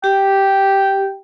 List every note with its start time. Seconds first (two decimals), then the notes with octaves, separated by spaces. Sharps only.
0.04 G4 G5